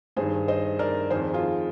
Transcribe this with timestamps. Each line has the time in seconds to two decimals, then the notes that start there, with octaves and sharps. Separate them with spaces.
0.16 G2 G#4 C5
0.22 D#3
0.48 C5 D#5
0.79 A#4 D5
1.10 D#3 G#4 C5
1.16 F2
1.33 F4 G#4